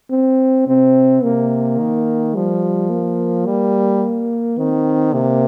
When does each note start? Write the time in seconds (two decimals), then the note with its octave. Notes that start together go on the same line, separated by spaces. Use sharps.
0.11 C4
0.67 C3 C4
1.22 C3 A#3
1.79 D#3
2.35 F3 G3
2.90 A#3
3.46 G3
4.58 D#3 C4
5.13 C3 A#3